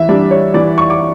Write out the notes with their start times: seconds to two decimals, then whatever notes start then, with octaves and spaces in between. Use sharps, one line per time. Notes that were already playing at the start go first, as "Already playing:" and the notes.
Already playing: E3 E5
0.09 G3 D4 D5
0.31 C#5
0.54 E3 D5
0.78 C#6
0.90 D6